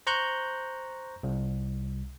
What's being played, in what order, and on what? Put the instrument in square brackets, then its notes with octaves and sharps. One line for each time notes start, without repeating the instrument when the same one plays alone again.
[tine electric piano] C5 A#5 C#6 F#6 G6
C2